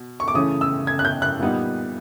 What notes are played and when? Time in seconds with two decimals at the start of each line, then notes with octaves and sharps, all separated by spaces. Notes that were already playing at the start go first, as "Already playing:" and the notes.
Already playing: B2
0.20 C#6
0.28 D6
0.34 C#3 E3 A3 C#4 D#6
0.61 E6
0.87 G#6
0.99 F#6
1.05 G6
1.22 F#6
1.40 A#2 G3 B3 D#4